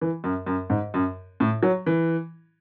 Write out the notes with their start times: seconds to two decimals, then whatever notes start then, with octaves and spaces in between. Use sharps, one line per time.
0.01 E3
0.24 F#2
0.46 F#2
0.70 G#2
0.94 F#2
1.40 A2
1.63 F#3
1.86 E3